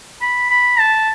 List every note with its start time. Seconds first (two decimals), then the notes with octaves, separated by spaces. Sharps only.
0.22 B5
0.51 B5
0.80 A5